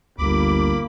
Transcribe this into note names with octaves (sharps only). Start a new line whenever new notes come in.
G1 D2 A#3 B5 D6